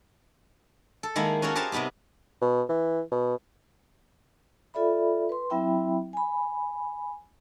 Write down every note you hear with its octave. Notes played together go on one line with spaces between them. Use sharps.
A4
D#3 G#3 A#3 E4
C#4 F#4 A4 A#4 C#5
G4 G#4 A#4 C5 A5
C3 G3 B3 D#4 G4
B2
E3
B2
F4 A4 D5 E5 B5
B4 C6
F#3 C4 E4 E5 G5 B5
G#5 B5